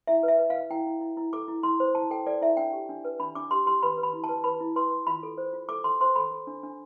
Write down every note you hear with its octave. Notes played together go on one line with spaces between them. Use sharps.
E4 E5
B4
E5
B4
F5
B4
E4 G5
E4
E4
E4
A4 D6
E4
E4 C6
C5
E4 A5
A4 G5
A4 D5
E4 E5
D4 G5
G4
D4
B4
D4 B5
D4 D6
G4 C6
G4 C6
B4 B5
B4
B5
E4
A5
B4
B4 B5
E4
B4 C6
B4
F4 B5
A4
C5
F4
A4 D6
A4 C6
C5 C6
A4 B5
A4
D4
D4